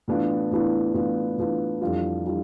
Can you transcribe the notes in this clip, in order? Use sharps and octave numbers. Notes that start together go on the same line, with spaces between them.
A2 E3 B3 D4 F4
A2 E3 B3 D4 F4
A2 E3 B3 D4 F4
A2 E3 B3 D4 F4
F2 E3 G3 D4 F4
E3 G3 D4 F4